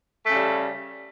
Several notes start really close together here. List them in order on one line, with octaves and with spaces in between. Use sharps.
A3 C#3 G3